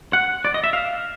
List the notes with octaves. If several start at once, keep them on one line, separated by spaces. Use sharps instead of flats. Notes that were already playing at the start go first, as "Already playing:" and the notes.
F#5
D5
D#5
E5
F5